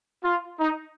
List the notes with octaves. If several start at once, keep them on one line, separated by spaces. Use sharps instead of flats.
F4
D#4